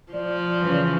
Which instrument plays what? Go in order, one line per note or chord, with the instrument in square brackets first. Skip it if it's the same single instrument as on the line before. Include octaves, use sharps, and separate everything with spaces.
[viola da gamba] F3 [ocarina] D5
[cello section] C#3 E3